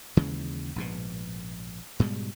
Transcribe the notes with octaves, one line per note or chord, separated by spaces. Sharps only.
D#2 C#3 E3 G#3
A#1 G#2 B2
G#2 B2 G3 G#3